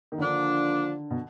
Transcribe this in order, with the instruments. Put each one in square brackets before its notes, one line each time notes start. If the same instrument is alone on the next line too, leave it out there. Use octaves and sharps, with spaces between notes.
[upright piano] D#3
[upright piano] D3 [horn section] F3 A#3 D4 F4
[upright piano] B2